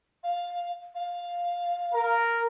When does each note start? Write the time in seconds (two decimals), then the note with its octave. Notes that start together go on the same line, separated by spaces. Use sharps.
0.24 F5
0.95 F5
1.92 A#4